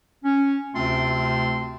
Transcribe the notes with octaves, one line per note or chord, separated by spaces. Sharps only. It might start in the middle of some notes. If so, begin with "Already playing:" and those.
C#4
D2 C3 A3 C4 F4 C6